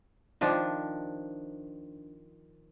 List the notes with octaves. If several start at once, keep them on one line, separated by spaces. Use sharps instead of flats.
D#3 F3 D4